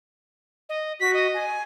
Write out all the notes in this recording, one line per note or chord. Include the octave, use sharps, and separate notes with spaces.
D#5
F#4 B6
D#5
G#5